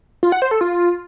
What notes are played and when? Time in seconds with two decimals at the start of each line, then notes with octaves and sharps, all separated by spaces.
0.23 F4
0.32 F#5
0.42 C5
0.51 A4
0.61 F4